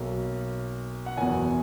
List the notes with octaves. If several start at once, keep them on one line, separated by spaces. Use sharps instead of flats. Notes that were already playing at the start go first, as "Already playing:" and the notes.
Already playing: B1 B2 A#3
F#5
F#1 E2 B2 G#5